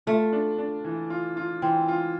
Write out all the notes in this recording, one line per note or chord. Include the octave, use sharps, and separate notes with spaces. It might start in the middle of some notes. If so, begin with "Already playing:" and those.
A3 F4
D4
D4
E3
F4
F4
E3 C4
F4